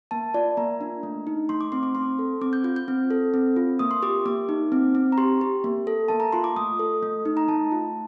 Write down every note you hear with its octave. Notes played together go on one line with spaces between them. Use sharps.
A#3 A5
F4 D5
A#3 A#5
D4
A3
D#4
A3 C6
D6
C4 C6
D6
C4 C6
A4
C4 D6
G6
F4 G6
G6
C4
A4
C4
F4
A#3 D#6
C6
G4 D6
A#3 D6
D#4
C4
C4
A#5
G4 C6
G4
A#3
A4
A#3 A5
A#5
F4 C6
D6
A3 D#6
A4
A3
D#4
A#5
A3 A5
F4